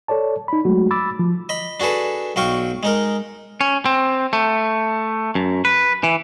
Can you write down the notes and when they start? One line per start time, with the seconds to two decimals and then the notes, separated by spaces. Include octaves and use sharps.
0.08 A4 C#5 D5 A5
0.48 D#4 B5
0.65 F#3 G#3 A3 F#4
0.91 B5 D6 E6 A6
1.19 F3
1.49 D#5 B5
1.80 D4 F#4 G#4 A4 B4
2.36 B1 F#4 F5 G5 C#6
2.83 G#3 D#4 A#4
3.61 C#4
3.86 C4
4.33 A3
5.35 F#2
5.65 B4
6.03 E3